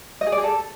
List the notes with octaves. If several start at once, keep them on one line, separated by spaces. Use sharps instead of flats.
D#5
G#4
D5
G#4
A4